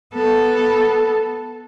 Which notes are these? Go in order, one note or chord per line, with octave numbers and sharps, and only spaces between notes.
B3 A4